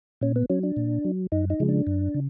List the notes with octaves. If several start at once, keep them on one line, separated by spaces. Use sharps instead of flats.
A#2 C#4
B3
F#3 C#4
D4
A#2
F#3
F#2 D#4
D#4
C#3 F3 G#3
D4
F#2
C#3